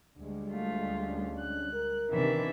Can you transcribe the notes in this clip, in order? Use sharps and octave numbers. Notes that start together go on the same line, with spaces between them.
D2 G3 G#3
A3 F4
C#4 D4
F#6
A#4
C3 D#3 E3 B3 D4 E5